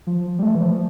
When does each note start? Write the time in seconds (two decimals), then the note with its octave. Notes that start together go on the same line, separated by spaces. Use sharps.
0.07 F3
0.39 G3
0.43 A3
0.55 E3
0.62 F3